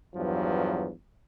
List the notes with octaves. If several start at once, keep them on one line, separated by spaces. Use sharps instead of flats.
E2 G2 F3 F#3